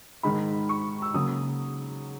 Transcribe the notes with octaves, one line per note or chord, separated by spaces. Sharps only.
G#2 D#3 G#3 D#4 B5
C#6
E6
C#3 F#3 A#3 D#6